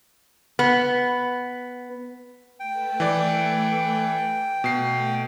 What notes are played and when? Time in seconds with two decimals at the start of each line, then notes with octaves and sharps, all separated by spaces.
0.59 B3
2.60 A3 A4 B4 G5
3.00 E3 D5
4.64 B2 A3 C7